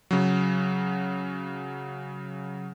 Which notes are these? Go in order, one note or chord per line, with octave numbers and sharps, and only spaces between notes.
C#3 F#3